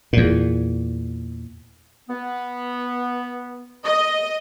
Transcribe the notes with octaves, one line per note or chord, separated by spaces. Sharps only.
E2 A#2
B3
D#5